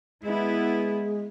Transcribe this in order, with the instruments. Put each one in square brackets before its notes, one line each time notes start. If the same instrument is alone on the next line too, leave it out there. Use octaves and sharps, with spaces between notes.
[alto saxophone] G#3 [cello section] B3 E4